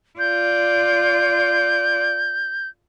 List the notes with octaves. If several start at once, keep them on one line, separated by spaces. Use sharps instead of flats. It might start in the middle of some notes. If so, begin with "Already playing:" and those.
F4 D5 G6